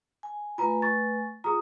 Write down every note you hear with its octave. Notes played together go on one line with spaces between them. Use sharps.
G#5
A3 F4 B4 G#5 A#5
C#6 A6
F4 G#4 A#5 D#6